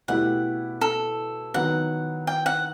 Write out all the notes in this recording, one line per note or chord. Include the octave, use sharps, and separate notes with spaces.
B2 A3 E4 G4 F#5
A4
D#3 F#3 B3 F#5
G5
F#5